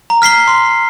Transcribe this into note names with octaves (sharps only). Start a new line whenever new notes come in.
A#5
F6 B6 C7 G7
C6